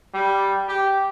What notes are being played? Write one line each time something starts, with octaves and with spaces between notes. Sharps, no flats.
G3
G4